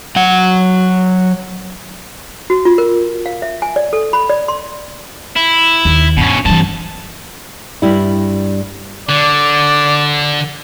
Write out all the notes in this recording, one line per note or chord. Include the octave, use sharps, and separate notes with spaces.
F#3 F#5
F#4
F4
A#4
F5
E5
G#5
D5
A4
B5
D5
C6
E4
D#2
G2 B2 C#4
G2 C3 E3 A5
G2 G3 E4
D3 D5